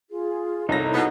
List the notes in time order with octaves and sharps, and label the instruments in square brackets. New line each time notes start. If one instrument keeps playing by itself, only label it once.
[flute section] F4 G#4
[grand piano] C2 A4 A#6 [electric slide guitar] D#4 [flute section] E4 C#5
[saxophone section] B2 B3